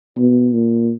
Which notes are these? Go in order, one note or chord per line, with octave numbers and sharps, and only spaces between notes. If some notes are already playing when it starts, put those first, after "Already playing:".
B2
A#2